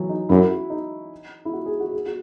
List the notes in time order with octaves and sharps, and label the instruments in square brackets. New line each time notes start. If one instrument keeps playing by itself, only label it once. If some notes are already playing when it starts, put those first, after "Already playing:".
Already playing: [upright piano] E3 F#3
D#4
[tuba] F#2 [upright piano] E4
[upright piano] F#4
D#4
E4
F#4
G#4
F#4
G#4
F#4